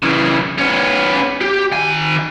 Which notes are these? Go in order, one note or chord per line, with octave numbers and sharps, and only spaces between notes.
C#3 E3
B3 C#4
G4
D#3 G#5